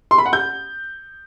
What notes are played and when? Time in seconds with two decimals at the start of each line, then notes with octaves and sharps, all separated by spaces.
0.11 C6
0.18 B5
0.26 F#5
0.33 G6